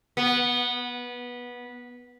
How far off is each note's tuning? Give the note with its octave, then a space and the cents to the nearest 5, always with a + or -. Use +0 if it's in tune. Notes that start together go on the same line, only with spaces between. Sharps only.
B3 -15